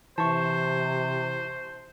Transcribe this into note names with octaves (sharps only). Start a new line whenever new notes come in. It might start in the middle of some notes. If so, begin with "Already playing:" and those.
C3 E3 E4 C5 A5 C#6